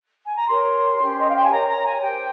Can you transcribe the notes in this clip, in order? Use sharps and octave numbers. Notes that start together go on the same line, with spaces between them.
G#5
A#5
G4 A#4 C#5 C6
C#4 G4 C5
D#5
F5
G5
G#5
G4 A#4 C#5 A#5
A#5
G#5
G4 C5 G5